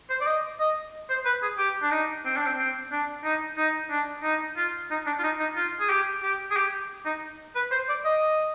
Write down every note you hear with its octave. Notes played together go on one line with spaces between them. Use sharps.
C5
D5
D#5
D#5
C5
B4
G#4
G4
D4
D#4
C4
D4
C4
C4
D4
D#4
D#4
D4
D#4
F4
D#4
D4
F4
D#4
D#4
F4
G#4
G4
G4
G#4
G4
D#4
B4
C5
D5
D#5